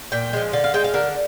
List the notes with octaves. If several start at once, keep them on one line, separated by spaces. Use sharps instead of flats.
A#2 G5
F3 G#3
D3 F5
F5
G#3 G5
F5
D3 A#4